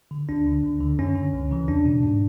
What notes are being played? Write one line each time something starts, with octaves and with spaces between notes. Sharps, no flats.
D3
D2 D4
D3
D2
D3
F#2 C#4
D3
C#2
C#3 E3
E2 D4
B2
G#2